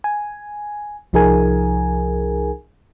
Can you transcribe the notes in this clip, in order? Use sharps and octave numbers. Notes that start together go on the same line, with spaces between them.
G#5
C2 F3 D#4 G#4 A#4 G#5